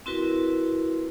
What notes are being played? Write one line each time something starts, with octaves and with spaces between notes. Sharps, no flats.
C4 E4 F#4 A#4 B4